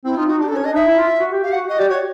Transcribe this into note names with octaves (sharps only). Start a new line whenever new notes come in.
C4 E4
D#4 F4
D#4 F#4
D4 G4
A4
C#4
C#5
D4 D#5
D#4 E5
E4
F4
F#4
G4
G4 F5
F#5
F#4
F#4 D#5
G4 D5
F#4 C#5